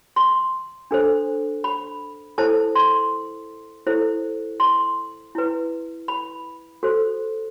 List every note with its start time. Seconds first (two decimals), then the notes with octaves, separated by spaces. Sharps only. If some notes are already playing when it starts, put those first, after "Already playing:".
0.16 C6
0.91 D4 A4 C5
1.64 B5
2.38 E4 A4 C5 A5
2.75 C6
3.87 E4 A4 C5
4.60 C6
5.35 E4 B4
6.08 B5
6.83 F#4 A4 C5